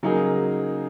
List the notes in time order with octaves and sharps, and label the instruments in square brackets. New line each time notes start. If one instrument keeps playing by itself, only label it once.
[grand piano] C#3 F#3 A#3 D#4 G#4